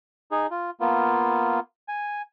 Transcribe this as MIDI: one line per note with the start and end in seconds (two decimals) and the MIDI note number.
0.31 0.47 63
0.31 0.47 68
0.51 0.70 65
0.80 1.60 58
0.80 1.60 59
0.80 1.60 65
1.88 2.22 80